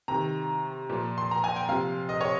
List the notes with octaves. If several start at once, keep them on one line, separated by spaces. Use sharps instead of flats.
C3 D#3 A#5
A#2 F3
C6
A#5
G#5
G5
C3 F3 F5
D#5
C#5